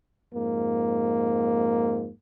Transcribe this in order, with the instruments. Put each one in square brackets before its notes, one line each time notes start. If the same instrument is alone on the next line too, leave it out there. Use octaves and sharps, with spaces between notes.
[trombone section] F2 G#2 A#3